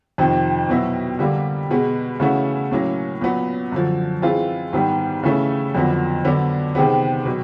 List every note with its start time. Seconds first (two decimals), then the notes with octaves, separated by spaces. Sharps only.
0.18 F2 C3 D#3
0.69 B2 F#3 B3 E4
1.19 D3 G3 A#3
1.70 B2 G#3 B3
2.20 C#3 E3 A3 C#4 F#4
2.71 A2 F#3 A#3 C#4
3.21 A#2 F#3 B3
3.72 F#2 D3 F3
4.22 E3 G#3 C4 F4
4.73 G#2 D#3 G3 B3
5.23 C#3 E3 A3 C#4
5.75 F2 D3 F#3 B3
6.25 D3 F#3 B3 D4
6.75 C3 D#3 G#3 B3
7.25 B2 F#3